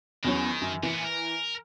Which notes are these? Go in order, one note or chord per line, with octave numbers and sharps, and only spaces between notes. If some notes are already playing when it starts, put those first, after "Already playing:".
E2 D#3 F#3 C#4
F#2
A#2 E3 B3
A#4